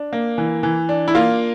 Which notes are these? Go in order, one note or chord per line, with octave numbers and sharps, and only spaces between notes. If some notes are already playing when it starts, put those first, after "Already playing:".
Already playing: D4
A#3
E3
E3
D4
E4
A#3 F4